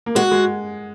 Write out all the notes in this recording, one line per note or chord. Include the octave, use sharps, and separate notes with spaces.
A#3
G#3 F#4
G#3